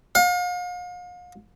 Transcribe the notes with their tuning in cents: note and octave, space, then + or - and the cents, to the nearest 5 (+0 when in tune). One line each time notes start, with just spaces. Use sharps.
F5 +40